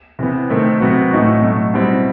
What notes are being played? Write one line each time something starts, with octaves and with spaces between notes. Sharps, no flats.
C3 E3 B3
C3 D#3 A3 C4
C3 F#3 B3 F#4
A2 E3 A3 D#4 F#4
B2 F#3 A3
B2 G3 C4 E4